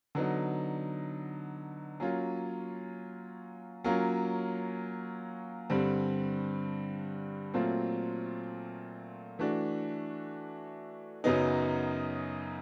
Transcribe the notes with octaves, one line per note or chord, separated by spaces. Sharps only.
D3 F#3 B3 D#4
F#3 A#3 C#4 F4
F#3 A#3 C#4 F4 A#4
G2 D3 G3 C4
A#2 F#3 A3 C4 F4
E3 A3 D4 F#4
F#2 C#3 F#3 B3 D#4